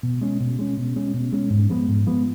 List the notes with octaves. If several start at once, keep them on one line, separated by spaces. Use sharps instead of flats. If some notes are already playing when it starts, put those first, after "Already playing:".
B2
G#3 C#4
B2
G#3 C#4
B2
G#3 C#4
B2
G#3 C#4
G#2
F3 G#3 B3
G#2
F3 G#3 B3